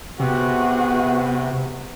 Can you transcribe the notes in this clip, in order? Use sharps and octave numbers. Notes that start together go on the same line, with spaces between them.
C3 B3 F#4 G#4